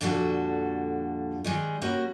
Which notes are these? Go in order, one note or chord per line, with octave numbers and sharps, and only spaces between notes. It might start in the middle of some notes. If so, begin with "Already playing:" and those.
F2 A#2 D3 G3 F#4 A4
D#3 G3 G#3
G3 A#3 C#4 F#4